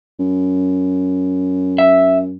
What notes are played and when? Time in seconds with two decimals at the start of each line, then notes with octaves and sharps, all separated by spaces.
0.19 F#2
1.78 E5